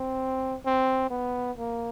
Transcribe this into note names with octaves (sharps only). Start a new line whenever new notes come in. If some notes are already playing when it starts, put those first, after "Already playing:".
Already playing: C4
C4
B3
A#3